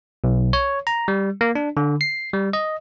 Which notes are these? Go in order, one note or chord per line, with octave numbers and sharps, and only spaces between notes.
B1
C#5
A#5
G3
A#3
D4
D3
C7
G3
D#5